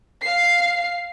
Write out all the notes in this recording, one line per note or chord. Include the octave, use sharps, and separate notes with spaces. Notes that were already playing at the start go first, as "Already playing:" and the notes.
F5 C7